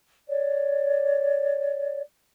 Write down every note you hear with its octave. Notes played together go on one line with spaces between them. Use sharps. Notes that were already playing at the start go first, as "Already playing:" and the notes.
C#5 D5